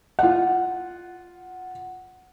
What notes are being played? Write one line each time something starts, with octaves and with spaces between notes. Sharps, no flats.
F4 F#5